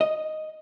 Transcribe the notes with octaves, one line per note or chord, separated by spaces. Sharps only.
D#5